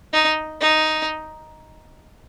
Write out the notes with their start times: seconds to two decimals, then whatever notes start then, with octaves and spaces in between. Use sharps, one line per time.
0.13 D#4
0.61 D#4